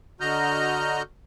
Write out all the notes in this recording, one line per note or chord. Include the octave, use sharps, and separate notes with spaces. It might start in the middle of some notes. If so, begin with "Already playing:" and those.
D3 F#4 D#5 A#5 F6 G6